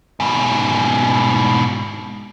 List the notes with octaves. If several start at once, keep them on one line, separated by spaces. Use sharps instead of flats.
G#2 B2